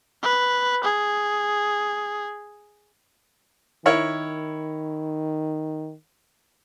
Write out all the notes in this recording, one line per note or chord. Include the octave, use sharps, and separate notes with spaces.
B4
G#4
D#3 E4 A#4 C#5